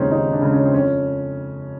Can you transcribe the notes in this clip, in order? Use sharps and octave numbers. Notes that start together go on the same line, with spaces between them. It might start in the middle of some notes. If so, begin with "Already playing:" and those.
Already playing: D#2 C#3 F3 G#3 C4 C#4 D#4
D#2 D#4
D4
C#3 F3 G#3
C#4
C4
F2 C#4